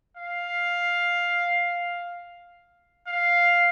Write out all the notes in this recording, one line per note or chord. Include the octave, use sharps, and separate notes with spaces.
F5
F5